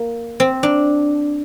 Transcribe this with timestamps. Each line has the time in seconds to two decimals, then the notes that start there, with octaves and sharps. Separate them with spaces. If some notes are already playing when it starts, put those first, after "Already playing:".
Already playing: A#3
0.40 C4
0.63 D4